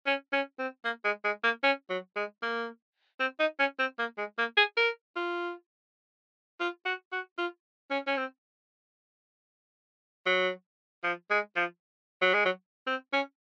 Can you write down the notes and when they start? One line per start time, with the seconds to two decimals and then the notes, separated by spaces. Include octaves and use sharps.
0.06 C#4
0.33 C#4
0.59 C4
0.85 A#3
1.04 G#3
1.24 G#3
1.44 A#3
1.63 C#4
1.90 F#3
2.16 G#3
2.42 A#3
3.20 C4
3.39 D#4
3.59 C#4
3.79 C4
3.99 A#3
4.18 G#3
4.38 A#3
4.57 G#4
4.77 A#4
5.16 F4
6.60 F4
6.85 F#4
7.12 F#4
7.38 F4
7.90 C#4
8.07 C#4
8.17 C4
10.26 F#3
11.04 F3
11.30 G#3
11.56 F3
12.22 F#3
12.33 G#3
12.45 F#3
12.87 C4
13.13 C#4